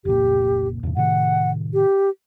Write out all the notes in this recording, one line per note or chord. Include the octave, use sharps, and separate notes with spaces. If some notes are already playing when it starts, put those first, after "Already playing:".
F1 C#2 A#2 G4
E2 A2 C3
A2 C3 D#3 F#5
G4